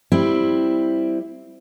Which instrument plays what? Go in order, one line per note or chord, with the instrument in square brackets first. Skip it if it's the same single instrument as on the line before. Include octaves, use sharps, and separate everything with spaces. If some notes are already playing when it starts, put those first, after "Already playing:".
[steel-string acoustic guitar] G3 C4 E4